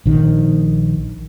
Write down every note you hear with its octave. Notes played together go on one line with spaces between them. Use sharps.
A#1 D#3